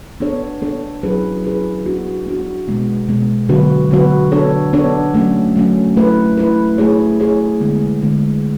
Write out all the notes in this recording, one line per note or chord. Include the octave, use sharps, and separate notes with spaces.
B3 D4 A4 C#5
B3 D4 A4 C#5
F#3 C#4 E4 G#4 B4
F#3 C#4 E4 G#4 B4
B3 D4 F#4
B3 D4 F#4
B2 G#3 B3
B2 G#3 B3
D3 F#3 B3 F#4 B4
D3 F#3 B3 F#4 B4
B3 D4 A4 C#5
B3 D4 A4 C#5
F#3 A3 C#4
F#3 A3 C#4
A3 E4 B4
A3 E4 B4
A3 E4 G#4 C#5
A3 E4 G#4 C#5
D3 G#3 B3
D3 G#3 B3